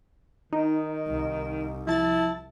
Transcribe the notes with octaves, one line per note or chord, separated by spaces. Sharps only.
D#3 D#4
C2
F3 E4 A5 A6